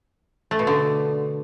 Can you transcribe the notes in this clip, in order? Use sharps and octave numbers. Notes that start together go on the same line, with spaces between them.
A3
B2
D3